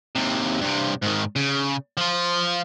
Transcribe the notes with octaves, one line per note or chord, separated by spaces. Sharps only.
D#2 C3
G2 C3
G#2 D#3
C#3
F3 F4